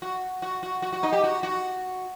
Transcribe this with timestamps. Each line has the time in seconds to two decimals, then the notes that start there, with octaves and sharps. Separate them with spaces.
0.02 F#4
0.42 F#4
0.63 F#4
0.82 F#4
0.93 F#4
1.03 D#4
1.13 G4
1.24 F#4
1.43 F#4